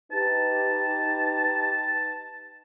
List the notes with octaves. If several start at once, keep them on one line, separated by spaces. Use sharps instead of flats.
D#4 G4 B4 A5